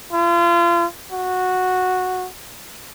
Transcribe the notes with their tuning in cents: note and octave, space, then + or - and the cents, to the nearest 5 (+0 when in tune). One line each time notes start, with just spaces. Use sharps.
F4 -35
F#4 -10